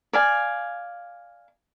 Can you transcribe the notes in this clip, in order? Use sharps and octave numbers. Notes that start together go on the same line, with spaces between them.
D5 F5 G#5